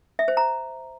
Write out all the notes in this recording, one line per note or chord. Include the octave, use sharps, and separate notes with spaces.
E5
C5
A#5